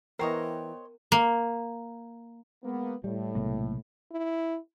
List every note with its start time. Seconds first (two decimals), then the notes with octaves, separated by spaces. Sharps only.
0.19 E3 B3 A#4 C5 C#5 D#5 G5
1.12 A#3
2.63 G#3 A#3 B3
3.04 A2 G3
3.35 B1 C3 G#3 A#3
4.12 E4